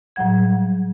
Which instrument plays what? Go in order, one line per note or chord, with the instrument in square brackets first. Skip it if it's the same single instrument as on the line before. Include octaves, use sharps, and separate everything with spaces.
[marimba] A2 F#3 G3 F#5 G#6